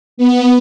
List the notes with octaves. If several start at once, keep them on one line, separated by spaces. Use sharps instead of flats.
B3